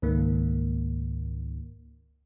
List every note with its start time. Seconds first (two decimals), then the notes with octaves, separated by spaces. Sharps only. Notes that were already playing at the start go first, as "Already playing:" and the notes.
0.02 C#2 G#2 D#3 A#3